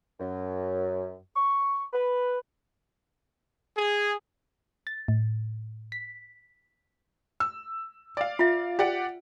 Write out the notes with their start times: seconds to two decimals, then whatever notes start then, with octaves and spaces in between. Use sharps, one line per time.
0.20 F#2
1.36 C#6
1.93 B4
3.76 G#4
4.87 A6
5.08 A2
5.92 B6
7.40 E6
8.17 D5 F5
8.39 F4 E5
8.79 G4 D5 F#5